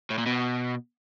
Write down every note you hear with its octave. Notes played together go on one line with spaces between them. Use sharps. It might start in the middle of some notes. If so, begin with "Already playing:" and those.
A2
A#2
B2